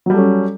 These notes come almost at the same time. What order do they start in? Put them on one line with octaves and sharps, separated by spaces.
F#3 G3 A4 C#4